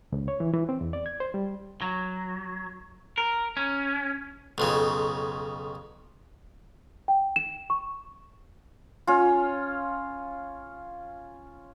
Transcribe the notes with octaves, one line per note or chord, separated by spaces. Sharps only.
C#2
C#5
E3
E3
C4
E2
D5
G#6
C5
G3
F#3
A#4
C#4
B1 F2 C#3
G5
E7
C#6
C#4 F4